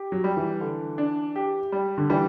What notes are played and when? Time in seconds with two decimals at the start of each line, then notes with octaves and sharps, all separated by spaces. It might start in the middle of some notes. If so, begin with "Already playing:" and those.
Already playing: G4
0.12 F#3
0.24 G3
0.37 E3
0.61 D3
0.98 D4
1.36 G4
1.72 G3
1.98 D3
2.10 E3 G3